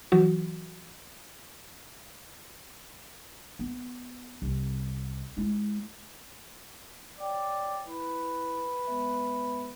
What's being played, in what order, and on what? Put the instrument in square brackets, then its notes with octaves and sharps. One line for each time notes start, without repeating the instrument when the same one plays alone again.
[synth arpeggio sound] E3 F#3 F#4
[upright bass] B3
C2
G#3 E4
[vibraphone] C#5 G5 [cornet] D5
[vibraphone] E4 [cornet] B4
[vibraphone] G#3 B3 E5